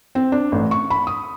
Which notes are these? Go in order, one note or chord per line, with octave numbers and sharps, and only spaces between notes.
C4
D4
A1
C#6
B5
D#6